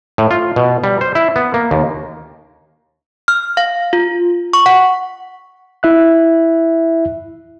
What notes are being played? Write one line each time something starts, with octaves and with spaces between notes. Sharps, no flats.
A2
F4
B2
G3
C5
E4
B3
A#3
D#2
F6
F5
F4
C#6
F#5
E4 E5 F#6